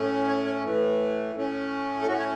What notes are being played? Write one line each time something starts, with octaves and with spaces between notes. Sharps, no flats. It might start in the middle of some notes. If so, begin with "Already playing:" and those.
Already playing: A2 A3 C#4
C#5
C#5
A2 E3 A3
A2 A3 C#4
A4
A2 A3 C#4 F#4
C#5